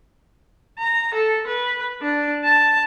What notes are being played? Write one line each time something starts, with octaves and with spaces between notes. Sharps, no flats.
A#5
A4
B4
D4
A5